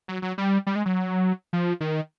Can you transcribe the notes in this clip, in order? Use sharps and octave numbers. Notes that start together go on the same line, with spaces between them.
F#3
F#3
G3
G3
G#3
F#3
F3
D#3